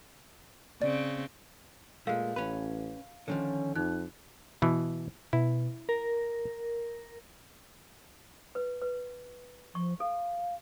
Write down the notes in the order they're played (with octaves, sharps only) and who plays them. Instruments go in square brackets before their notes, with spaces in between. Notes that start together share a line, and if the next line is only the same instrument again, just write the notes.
[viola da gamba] C#3 C4 [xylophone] D5
[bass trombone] A#2 [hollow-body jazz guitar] G#3 A3 [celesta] F5
[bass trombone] A1 [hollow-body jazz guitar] C#4 B4
[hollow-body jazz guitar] D3 D#3 F3 [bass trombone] C#4
[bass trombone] F2 [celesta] D#4 F#6
[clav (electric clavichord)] B2 E3
[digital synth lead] B2 [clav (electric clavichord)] E4
[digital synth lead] A#4
[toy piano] B4
B4
[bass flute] F3 [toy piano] C#6
[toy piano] A4 [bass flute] F5